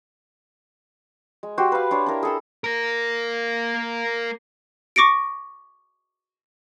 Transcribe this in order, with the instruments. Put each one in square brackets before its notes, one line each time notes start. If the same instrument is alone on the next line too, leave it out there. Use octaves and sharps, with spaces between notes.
[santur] G#3
F#4 G4 C5
B4 F5
D4 C5 C#5
D4 E4 A#4
G#4 A4 E6
[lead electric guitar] A#3 A#4
[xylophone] C#6 D6 A#6 C#7 D7